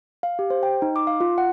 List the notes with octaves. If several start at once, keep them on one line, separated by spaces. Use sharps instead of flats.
F5
G4
C5
G5
D#4
D6
F5
F4
F#5